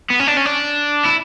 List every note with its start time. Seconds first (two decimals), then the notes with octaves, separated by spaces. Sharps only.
0.10 B3
0.20 C#4
0.27 D4
0.37 C#4
0.45 D4
1.05 E4